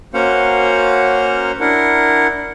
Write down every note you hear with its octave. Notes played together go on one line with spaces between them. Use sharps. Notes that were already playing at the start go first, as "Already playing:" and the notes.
A#3 C#4 F#4 C5 F5 F#5
D4 E4 A#4 F#5